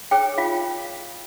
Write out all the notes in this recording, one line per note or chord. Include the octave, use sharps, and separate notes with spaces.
G#4 C#5 G5
F4 F5